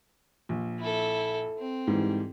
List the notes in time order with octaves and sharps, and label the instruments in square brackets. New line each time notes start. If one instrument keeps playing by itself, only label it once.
[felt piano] A#1
[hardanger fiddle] E4 A4
C4
[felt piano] G#2 E3 G3